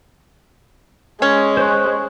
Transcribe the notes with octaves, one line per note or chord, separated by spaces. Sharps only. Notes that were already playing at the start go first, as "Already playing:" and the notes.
G#3 C#4
C5 C#6 F#6